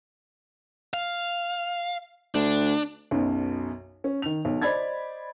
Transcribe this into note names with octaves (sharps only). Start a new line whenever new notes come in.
F5
D2 D4
B1 F#2 B2
C#4
D#3 F7
B1
C5 D5 D#5 B5 G#6 A6